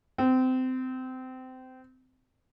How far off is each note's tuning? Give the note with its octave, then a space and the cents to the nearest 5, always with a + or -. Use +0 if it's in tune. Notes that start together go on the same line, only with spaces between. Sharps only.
C4 -25